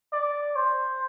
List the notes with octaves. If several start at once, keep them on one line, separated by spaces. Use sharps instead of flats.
D5
C5